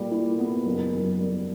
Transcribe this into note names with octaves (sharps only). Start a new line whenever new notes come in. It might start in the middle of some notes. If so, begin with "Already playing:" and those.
Already playing: A#2 G3
E4
B3
F#1
F#2
G3